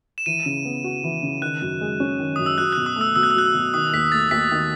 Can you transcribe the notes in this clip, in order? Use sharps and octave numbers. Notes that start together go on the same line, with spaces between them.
E7
E3 D#7
C#3
B3
F#4
E3
C#3
D#3 F#6
F#2
G#3
C#4
D#3
F#2 D#6
E6
F#3 F#6
B2 F#6
D#6
A3 E6
B2 E6
F#6
E6
F#3 F#6
E6
B2
D#3 D#6
D#2 B6
A3 A6
D#2 B6
D#3